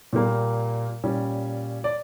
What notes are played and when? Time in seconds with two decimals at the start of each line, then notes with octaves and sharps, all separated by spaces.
0.13 A#2 G3 A#3
1.04 A#2 G3 C#4
1.84 D5